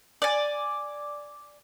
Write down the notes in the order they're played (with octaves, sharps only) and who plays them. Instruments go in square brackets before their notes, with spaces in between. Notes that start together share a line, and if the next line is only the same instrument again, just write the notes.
[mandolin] D5 G#5